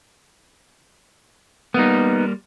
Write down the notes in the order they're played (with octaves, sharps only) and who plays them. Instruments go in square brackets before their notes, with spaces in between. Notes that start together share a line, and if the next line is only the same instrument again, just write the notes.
[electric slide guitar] G3 A#3 [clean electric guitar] B3 D#4